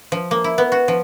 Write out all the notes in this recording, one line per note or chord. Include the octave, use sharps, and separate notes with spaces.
F3
A#3
E4
B3
F#4
F3